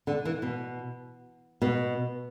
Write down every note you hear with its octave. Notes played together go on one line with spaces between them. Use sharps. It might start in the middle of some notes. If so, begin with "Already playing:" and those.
D3
E3
B2
B2